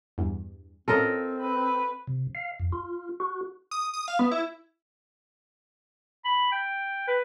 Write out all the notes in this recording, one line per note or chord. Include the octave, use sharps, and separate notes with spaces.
E2 G2
A2 C4 C#4 F4 A4 A#4 D#5
B4
C3
F5
F2
F4
F#4
D#6
D#6
F5
B3
E4
B5
G5
B4